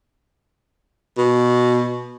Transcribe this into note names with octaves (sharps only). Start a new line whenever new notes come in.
B2